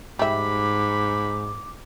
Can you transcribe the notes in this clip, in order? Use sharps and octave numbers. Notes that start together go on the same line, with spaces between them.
G#2 G3 E5 B5 D6